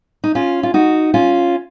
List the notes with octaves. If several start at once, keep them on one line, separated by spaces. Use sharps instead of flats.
D#4
C#4 F4
F4
D#4 F#4
C#4 F4